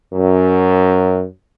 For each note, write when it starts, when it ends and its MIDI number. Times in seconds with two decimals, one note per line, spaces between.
0.14 1.23 42